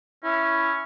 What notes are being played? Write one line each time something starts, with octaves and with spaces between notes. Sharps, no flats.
C#4 E4